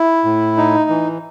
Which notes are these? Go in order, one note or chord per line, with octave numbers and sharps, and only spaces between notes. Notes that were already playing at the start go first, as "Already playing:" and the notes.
Already playing: E4
A2
D#4
E3